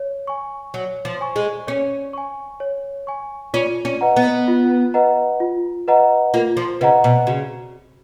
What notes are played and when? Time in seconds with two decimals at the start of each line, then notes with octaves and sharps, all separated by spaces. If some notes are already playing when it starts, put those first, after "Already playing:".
Already playing: C#5
0.27 G#5 C#6
0.74 F#3 C#5
1.05 F3
1.21 G#5 C#6
1.36 G#3
1.67 C#4 C#5
2.13 G#5 C#6
2.60 C#5
3.07 G#5 C#6
3.54 C#4 F4
3.85 C#4
4.01 B4 D#5 F#5 A#5
4.16 B3
4.48 F4
4.94 B4 D#5 F#5 A#5
5.40 F4
5.88 B4 D#5 F#5 A#5
6.34 A#3 F4
6.57 F3
6.81 C#3 B4 D#5 F#5 A#5
7.04 B2
7.27 C#3 F#4